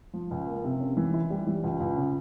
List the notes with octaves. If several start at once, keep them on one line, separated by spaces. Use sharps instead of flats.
F3
C#2
A#3
C3
C#4
E3
E4
G3
E3
C#2
C#2
C#3